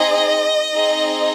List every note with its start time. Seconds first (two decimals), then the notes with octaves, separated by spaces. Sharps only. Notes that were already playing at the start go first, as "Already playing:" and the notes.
Already playing: C4 D#4 G#4 D#5
0.74 C4 D#4 G#4